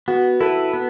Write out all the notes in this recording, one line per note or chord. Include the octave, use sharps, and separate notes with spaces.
B3 F#4
E4 A4 B4
B3